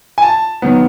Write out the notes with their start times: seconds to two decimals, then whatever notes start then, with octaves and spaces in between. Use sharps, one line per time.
0.18 G#5
0.22 A5
0.62 D#3 F#3 B3